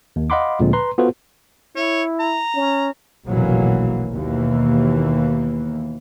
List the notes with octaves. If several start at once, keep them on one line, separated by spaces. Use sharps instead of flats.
D#2
D#5 F5 F#5 B5 C6 D6
D2 A#2 D3 F3 G#3 C4
B4 A#5 C6
B3 F4 F#4 A4 B4 C5
E4 C#5
A#5
C#4
F1 A#1 B2 E3 F#3 A#3
D#2 B2 E3 A#3